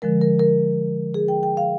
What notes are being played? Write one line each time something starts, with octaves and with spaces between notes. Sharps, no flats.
D3 F3 G#3 A#4
A#4
A#4
G#4
G5
G5
F5